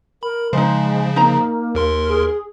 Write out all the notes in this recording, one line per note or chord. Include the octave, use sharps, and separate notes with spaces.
A#4 B5
C#3 F3 G#3 D#4 C5
A#3 D#4 A#5
D#2 A#4 C6
G#4